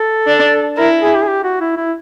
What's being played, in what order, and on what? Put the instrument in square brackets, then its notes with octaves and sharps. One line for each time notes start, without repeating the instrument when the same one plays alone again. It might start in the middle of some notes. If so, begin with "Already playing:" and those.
Already playing: [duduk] A4
[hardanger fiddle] D4
[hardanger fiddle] E4 [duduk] A#4
[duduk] G#4
G4
G#4
G4
F#4
E4
E4